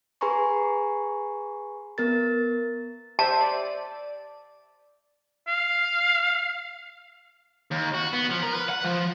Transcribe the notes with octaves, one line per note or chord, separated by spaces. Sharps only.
G#4 B4 G#5 A#5 C6 C#6
B3 A#4 A6
G4 C5 E5 A5
D5
F5
D#2
F#4
B3
F3
A#4
B4
F#5
F3